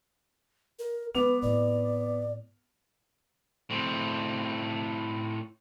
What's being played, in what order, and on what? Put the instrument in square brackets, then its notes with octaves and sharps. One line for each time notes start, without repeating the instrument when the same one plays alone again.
[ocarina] A#4
[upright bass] F#3 G#3 [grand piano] B3 D6 F7 [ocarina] B4
[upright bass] A2 C4 [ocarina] D5
[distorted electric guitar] A2 C4